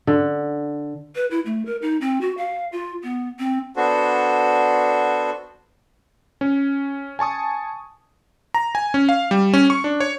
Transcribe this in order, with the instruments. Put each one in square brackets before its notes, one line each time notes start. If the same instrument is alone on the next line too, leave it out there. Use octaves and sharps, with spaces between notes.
[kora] D3
[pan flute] B4
E4
A3
A#4
D#4
C4
F#4
F5
F4
B3
C4
[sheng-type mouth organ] B3 D4 F#4 A4 C5
[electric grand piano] C#4
G#5 A5 C#6 D#6
A#5
G#5
C#4
F5
G3
C#4
C#6
D4
C#5